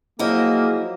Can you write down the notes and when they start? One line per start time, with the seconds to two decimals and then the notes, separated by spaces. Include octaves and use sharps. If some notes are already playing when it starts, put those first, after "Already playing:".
0.19 F3 F#3 A#3 E4 G#4 C5 D#5